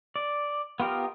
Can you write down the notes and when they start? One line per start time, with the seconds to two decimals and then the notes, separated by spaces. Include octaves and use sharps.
0.16 D5
0.80 B3 F4 G4 A#4 D#5